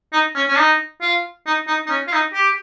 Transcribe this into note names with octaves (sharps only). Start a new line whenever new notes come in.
D#4
C#4
C#4
D#4
F4
D#4
D#4
D#4
C#4
F4
D#4
G4